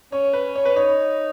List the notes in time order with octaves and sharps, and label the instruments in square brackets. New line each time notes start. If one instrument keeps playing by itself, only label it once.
[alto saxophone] C#4 [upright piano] C#5
[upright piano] B4
C#5
B4
[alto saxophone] D#4 [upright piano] C#5